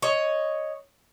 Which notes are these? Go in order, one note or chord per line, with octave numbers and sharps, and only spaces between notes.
C#5 D#5